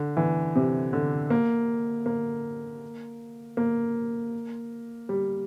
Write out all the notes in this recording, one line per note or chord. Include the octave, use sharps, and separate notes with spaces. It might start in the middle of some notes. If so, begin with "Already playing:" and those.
Already playing: D3
E3
C3
D3
A#3
A#3
A#3
G3